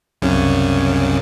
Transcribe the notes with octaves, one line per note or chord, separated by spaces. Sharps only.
C2 F#2 C#3